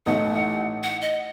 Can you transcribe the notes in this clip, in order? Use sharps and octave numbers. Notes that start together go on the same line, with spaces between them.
A1 A2 A3 D#4 F#5
F#5
D#5